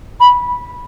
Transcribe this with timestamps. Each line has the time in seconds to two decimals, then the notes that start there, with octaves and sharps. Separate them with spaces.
0.20 B5